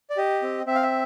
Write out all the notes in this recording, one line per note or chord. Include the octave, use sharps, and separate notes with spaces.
D5
G4 D#5
C4
C4 E5
F5
E5